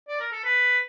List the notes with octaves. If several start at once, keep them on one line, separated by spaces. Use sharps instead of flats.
D5
A#4
A4
B4